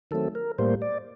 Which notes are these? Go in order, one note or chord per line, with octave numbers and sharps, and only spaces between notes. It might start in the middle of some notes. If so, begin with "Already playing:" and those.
D#3 F#3 A3 C4 A4
A#4
A2 G3 A#3 C5
D5